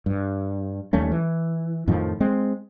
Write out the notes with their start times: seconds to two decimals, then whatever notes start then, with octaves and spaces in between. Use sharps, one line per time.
0.06 G2
0.93 D#2 G3 A3 C#4
1.11 E3
1.87 F2 A2 D#3 F3
2.20 G#3 C4